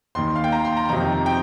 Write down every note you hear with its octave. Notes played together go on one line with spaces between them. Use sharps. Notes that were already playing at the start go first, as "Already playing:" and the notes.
D#2 D#3 C6
F5
G5
A#5
C6
A#5
F2 C3 D#3 A#5
G5